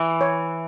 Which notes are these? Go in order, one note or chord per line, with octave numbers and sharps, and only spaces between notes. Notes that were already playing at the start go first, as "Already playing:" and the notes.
Already playing: E3 E4
C#5